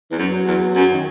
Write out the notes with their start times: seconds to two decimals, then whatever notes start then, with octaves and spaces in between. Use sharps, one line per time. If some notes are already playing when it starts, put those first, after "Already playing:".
0.11 E2 E3
0.18 F#2 F#3
0.47 E2
0.76 F#2
0.92 D#3